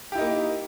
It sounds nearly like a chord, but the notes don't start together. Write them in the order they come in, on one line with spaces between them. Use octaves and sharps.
G4 E4 D#4 A#3